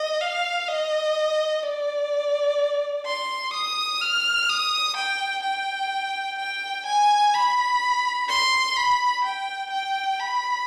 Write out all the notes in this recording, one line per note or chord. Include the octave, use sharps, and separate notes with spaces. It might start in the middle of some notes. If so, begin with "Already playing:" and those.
Already playing: D#5
F5
D#5
D5
C6
D#6
F6
D#6
G5
G5
G5
G#5
B5
C6
B5
G5
G5
B5